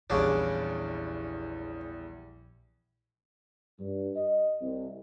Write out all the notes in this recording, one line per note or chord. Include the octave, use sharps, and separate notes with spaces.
A#1 E2 C#3 G3 D4
G2
D#5
C2